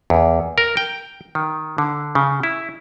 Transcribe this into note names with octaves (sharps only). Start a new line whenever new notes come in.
E2
A#4
G5
D#3
D3
C#3
E4